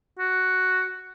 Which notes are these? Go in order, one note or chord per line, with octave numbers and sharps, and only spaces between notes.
F#4